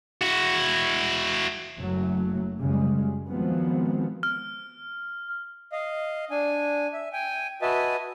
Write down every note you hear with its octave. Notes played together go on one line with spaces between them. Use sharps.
E4 F#4
F#1 F#2 F#3 A3
F#2 C#3 G3 G#3
D#3 F3 F#3 G#3 B3 C4
F6
D#5 F5
D4 G#5
E5
G5 G#5
F#4 B4 D#5 E5 G#5 A5